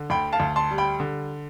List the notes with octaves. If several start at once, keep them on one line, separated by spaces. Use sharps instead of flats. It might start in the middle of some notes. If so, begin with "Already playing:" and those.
Already playing: D3
D2 G5 B5
F5 A5
D2
A5 C6
G3
G5 B5
D3